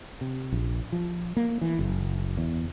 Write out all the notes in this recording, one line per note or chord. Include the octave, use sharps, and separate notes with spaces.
C3
A#1
F3
A#3
E3
F#1
E2